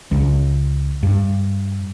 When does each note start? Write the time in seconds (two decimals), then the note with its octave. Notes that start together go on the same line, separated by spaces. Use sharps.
0.11 C#2
1.03 G2